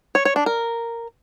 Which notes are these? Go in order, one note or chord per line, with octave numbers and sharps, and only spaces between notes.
C#5
C#5
D4
A#4